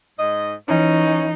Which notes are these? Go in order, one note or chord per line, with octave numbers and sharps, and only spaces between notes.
G#2 D#5
E3 C#4 D#4